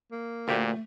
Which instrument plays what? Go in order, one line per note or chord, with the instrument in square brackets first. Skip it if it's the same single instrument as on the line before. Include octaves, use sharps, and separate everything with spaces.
[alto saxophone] A#3
[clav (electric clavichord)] D2 G4 [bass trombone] A#2 [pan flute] A3